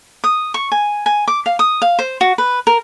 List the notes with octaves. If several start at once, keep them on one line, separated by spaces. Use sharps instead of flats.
D#6
C#6
G#5
G#5
D6
F5
D#6
F5
C5
F#4
B4
A#4